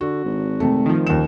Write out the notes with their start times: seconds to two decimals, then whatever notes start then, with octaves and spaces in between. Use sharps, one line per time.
0.01 D3 F#4
0.24 G#1
0.60 C3 A3
0.86 D#3 F3
1.07 D#1 D#2 E7